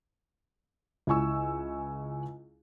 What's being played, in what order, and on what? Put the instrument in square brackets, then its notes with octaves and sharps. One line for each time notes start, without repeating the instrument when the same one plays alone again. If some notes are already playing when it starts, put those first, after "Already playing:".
[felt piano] C#2 E4 G#5 C#6 E6